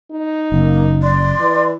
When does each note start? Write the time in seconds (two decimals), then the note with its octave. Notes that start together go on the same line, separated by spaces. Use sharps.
0.11 D#4
0.52 F#1 A#3
1.03 D5 C6
1.40 E3